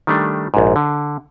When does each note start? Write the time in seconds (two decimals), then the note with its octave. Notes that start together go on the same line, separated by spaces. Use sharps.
0.07 D#3 G3 A3 D4
0.54 A#1 G#2
0.76 D3